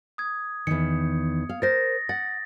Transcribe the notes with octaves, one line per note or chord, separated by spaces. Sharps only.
D#6 G#6
E2 D#3 C#7
F5
A#4 C5 A6 A#6
F#5 A6